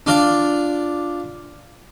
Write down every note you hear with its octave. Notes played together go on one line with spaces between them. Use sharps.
D4 F4 D5